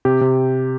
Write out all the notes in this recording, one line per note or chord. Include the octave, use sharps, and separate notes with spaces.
C3 G4
C3